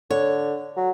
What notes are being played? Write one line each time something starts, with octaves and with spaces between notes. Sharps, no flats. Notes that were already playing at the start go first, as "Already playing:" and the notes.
D3 C#5
F#3